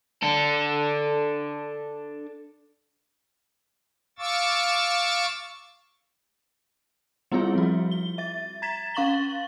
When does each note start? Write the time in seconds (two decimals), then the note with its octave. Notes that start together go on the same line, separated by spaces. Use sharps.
0.23 D4 A4
4.19 F5 C#6 D6 E6 A6
7.32 G3 B3 C4 E4 F4 G#4
7.55 F3 F#4
7.91 G7
8.18 E5 A6
8.62 A#5 G#6 A6 B6 E7
8.94 C#4 F5 C#6 A6 F#7 G7